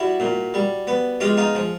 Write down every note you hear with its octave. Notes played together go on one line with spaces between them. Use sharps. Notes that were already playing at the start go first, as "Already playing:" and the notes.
Already playing: G3 E4 F#4
A#2
G3
B3
G#3 F4 G4
D#4 F4
F3